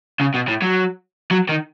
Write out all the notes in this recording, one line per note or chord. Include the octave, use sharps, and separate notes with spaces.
C#3
B2
A2
F#3
F#3
D#3